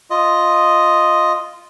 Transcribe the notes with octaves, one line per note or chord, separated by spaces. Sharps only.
F4 D#5